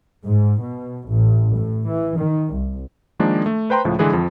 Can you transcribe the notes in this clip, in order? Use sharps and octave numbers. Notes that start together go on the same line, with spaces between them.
G#2
B2
A1
A2
E3
D#3
C2
D#3 F3 G#3 A#3 D4
A3
B4 C5 G5 A#5 C6
C#2 A2 F3
D3 E3 G#3 G#4 B4
F2 F3